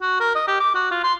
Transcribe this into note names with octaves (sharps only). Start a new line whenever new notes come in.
F#4
A#4
D#5
G4
D6
F#4
F4
C6